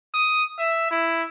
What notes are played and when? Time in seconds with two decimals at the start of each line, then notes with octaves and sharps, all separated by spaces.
0.14 D#6
0.59 E5
0.91 E4